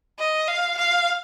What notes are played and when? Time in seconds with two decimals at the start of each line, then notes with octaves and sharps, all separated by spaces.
0.19 D#5
0.48 F5
0.78 F5